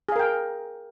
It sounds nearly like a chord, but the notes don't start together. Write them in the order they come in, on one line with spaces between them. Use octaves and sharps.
G#4 F5 A#4 G5